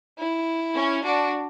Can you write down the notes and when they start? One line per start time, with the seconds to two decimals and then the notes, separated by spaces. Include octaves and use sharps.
0.18 E4
0.75 C#4
1.03 D4 F#4